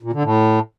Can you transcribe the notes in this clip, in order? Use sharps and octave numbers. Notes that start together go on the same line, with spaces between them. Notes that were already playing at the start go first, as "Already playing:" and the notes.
A#2
D3
A2